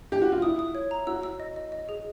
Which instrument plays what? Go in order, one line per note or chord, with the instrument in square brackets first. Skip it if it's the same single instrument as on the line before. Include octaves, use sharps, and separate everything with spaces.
[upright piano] G4
F#4
F4
[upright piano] E4 [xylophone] D#6
[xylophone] D#6
C#5
A#5
[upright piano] F#4 [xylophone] E6
[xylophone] E6
D#5
D#5
D#5
G#4